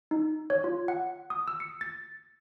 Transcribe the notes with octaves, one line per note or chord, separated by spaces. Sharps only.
D#4
C#5
F4
F#5
D#6
E6
C#7
A6